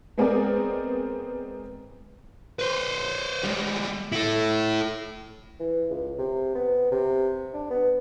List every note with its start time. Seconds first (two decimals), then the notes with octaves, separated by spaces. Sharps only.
0.17 G#3 B3 C4 G#4 A#4 D5
2.59 B4 C5
3.44 G3 G#3
4.12 E4 A4
5.60 E3
5.90 C#2
6.18 C3
6.55 B3
6.91 C3
7.53 D4
7.70 B3